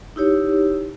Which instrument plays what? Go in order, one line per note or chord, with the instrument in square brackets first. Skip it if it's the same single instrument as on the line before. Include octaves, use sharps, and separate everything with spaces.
[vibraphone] D#4 E4 G4 C#5